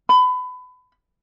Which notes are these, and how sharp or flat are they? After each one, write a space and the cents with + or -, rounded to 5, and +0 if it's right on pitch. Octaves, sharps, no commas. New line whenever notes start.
B5 +25